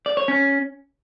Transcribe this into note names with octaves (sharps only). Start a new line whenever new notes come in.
D5
C#5
C#4